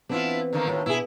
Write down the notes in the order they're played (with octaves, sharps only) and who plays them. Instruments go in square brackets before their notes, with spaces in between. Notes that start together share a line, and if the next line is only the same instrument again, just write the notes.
[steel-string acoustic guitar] E3 B3 C4 [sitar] D4 E4 F4
[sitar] D3 D#3 A#3
[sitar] D#2 A2 [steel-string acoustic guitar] F4
[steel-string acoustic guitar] B2 [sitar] E4 G#4